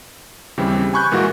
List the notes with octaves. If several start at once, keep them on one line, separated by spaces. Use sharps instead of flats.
D#2 C#3 E3 G3 C4
G#5 B5 C#6 F#6 G6
A#2 E3 G#3 A#3 F#4